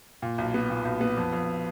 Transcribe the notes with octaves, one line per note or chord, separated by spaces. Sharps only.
A#2
B1
B3
A#2
B1
B3
F2
F2